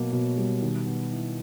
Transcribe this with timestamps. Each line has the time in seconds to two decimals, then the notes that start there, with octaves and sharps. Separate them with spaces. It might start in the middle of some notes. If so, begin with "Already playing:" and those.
Already playing: B2 F#3 A#3
0.13 B2
0.37 G3
0.62 D#3
0.86 B3
1.12 E4